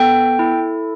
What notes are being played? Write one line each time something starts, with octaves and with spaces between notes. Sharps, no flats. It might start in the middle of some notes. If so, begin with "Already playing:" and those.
Already playing: B3 A4 G5
E4